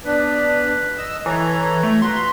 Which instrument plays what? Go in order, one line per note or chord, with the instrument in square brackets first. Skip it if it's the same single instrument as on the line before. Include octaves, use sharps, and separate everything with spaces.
[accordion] B3 D4 [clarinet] B4
[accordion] D#5 E6
[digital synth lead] E3 [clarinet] E4 [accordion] A4 C#5 A#5
[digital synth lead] A3
[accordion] A#2 F#4 A#5 [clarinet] B4 [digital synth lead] C6